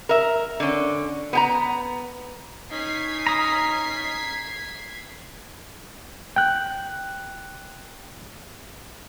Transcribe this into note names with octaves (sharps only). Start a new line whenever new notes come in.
A#4 E5
D3 C#4
B3 G5 A#5
C#4 D#4 G#6 B6 C7
A#5 D#6
G5 F#6